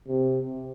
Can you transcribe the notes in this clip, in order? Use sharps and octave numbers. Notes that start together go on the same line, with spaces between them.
C3